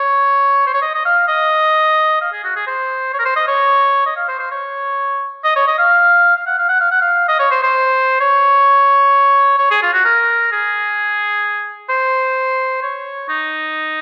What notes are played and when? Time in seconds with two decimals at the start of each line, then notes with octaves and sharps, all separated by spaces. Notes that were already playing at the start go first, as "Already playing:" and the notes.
Already playing: C#5
0.67 C5
0.74 C#5
0.82 D#5
0.95 D#5
1.05 F5
1.28 D#5
2.21 F5
2.33 G#4
2.44 F#4
2.56 G#4
2.67 C5
3.13 C#5
3.19 A#4
3.25 C5
3.36 D#5
3.47 C#5
4.06 D#5
4.17 F5
4.28 C5
4.39 C5
4.51 C#5
5.44 D#5
5.56 C#5
5.67 D#5
5.78 F5
6.36 F5
6.46 F#5
6.58 F5
6.69 F#5
6.80 F5
6.91 F#5
7.01 F5
7.28 D#5
7.39 C#5
7.51 C5
7.63 C5
8.20 C#5
9.59 C#5
9.71 G#4
9.83 F4
9.93 F#4
10.05 A#4
10.52 G#4
11.90 C5
12.83 C#5
13.29 D#4